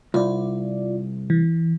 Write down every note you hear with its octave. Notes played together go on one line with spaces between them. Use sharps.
C2 F4 D5
E3